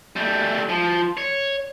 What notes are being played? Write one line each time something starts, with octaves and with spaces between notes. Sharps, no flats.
G3 A3
F3
C#5